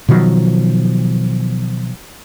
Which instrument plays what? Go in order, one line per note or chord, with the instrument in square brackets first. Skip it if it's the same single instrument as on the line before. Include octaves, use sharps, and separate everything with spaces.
[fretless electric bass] B2 D#3 F3 F#3